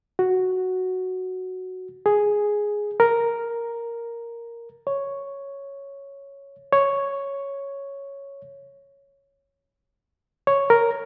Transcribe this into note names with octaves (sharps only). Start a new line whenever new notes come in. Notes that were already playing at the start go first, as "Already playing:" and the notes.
F#4
G#4
A#4
C#5
C#5
C#5
A#4